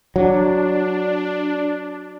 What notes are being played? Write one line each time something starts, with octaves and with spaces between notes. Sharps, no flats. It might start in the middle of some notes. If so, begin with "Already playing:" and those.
F#3 D4